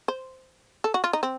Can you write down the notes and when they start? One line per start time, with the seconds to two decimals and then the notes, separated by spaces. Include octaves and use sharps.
0.08 C5
0.84 A4
0.94 F#4
1.04 F4
1.13 D#4
1.23 C4